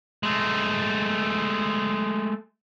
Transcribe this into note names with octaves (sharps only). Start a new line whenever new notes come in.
G#3 A3